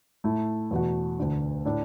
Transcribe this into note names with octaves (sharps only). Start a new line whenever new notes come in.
A2 A3 E4
E2 B2 A3 F#4
D2 D3 A3
A2 A3 D4 A4